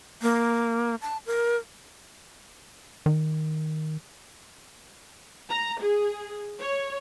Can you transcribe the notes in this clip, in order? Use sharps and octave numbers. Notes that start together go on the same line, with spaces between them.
A#3
A5
A#4
D#3
A#5
G#4
C#5